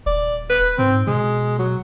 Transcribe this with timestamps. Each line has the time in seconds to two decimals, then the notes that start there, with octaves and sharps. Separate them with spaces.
0.06 D#1 D5
0.50 B4
0.79 G#2 C4
1.07 B2 G#3
1.59 F#3